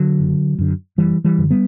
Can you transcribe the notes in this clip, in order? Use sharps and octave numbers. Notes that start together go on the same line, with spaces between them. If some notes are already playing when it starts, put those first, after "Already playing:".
Already playing: D3 F#3
F#1
F#2 D3
F#1 E3 G3
E3 G3
F#2 D3
G3 B3